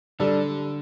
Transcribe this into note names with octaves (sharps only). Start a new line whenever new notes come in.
D3 G3 D4 A4